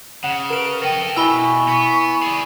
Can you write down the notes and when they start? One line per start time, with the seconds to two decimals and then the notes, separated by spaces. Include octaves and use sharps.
0.24 C#3 F#5
0.50 A#4 B4 D7
0.83 A4 D#5 G5
1.16 B2 E4 G#5 B5 C#6 E6 G7
1.68 B3
2.22 G#4 D5